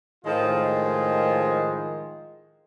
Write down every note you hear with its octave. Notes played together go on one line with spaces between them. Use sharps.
A2 D#3 F3 G#3 F4 G#4